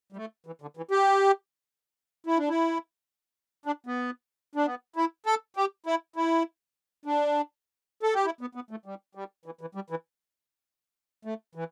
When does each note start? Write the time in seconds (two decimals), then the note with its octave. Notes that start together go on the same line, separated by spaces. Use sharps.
0.12 G3
0.17 A3
0.47 E3
0.62 D3
0.77 E3
0.91 G4
2.27 E4
2.38 D4
2.49 E4
3.66 D4
3.87 B3
4.55 D4
4.66 B3
4.96 E4
5.26 A4
5.56 G4
5.86 E4
6.16 E4
7.06 D4
8.03 A4
8.14 G4
8.25 E4
8.41 B3
8.55 B3
8.71 A3
8.86 G3
9.15 G3
9.46 E3
9.61 E3
9.75 G3
9.90 E3
11.25 A3
11.55 E3